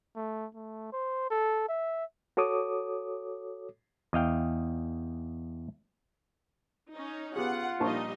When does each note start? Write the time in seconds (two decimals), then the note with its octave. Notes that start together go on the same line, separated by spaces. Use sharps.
0.16 A3
0.55 A3
0.93 C5
1.31 A4
1.69 E5
2.37 F#4 A4 C#5 D6 D#6
4.13 E2 D#5 F5 G5
6.92 C#4 D#4
7.36 B3 F4 G4 G#4 F#5
7.80 A#1 G3 D#4 D#5 A5 C#6